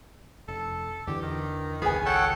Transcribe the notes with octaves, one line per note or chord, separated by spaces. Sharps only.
F1 A4
E2 D3 E3 G4
D#3
G#1 C#2 B3 G#4 G#5
A4 C#5 F#5 G5